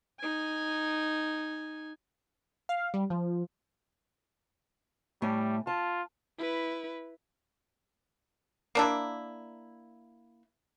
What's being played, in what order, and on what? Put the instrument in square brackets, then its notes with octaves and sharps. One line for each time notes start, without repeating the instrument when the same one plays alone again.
[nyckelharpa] D#4 G#5
[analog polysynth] F5
G3
F3
[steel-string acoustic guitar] A2 A3 G#5 [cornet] G3
[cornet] F4 [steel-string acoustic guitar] A5
[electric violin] E4 B4
[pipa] A#3 D4 E4